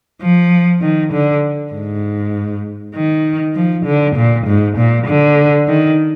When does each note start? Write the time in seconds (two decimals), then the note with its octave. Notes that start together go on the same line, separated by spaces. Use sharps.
0.21 F3
0.82 D#3
1.13 D3
1.73 G#2
2.95 D#3
3.55 F3
3.86 D3
4.16 A#2
4.46 G#2
4.77 A#2
5.07 D3
5.67 D#3